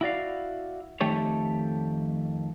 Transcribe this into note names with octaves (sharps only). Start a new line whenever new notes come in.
E4 F#4 D5 F5
F2 D#3 A3 G4 A4 C#5